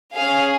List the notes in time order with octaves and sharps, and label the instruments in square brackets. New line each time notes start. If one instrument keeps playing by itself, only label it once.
[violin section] C#4 G#4 F5